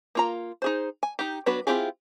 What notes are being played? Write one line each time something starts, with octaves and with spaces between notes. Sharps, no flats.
A#3 F4 A#5
D#4 G#4 C5
G#5
D#4 G4
F#3 B3 D4 F#4 B4
C4 E4 F4 G4 G#4